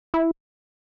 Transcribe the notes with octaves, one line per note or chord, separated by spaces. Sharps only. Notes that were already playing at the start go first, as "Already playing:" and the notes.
E4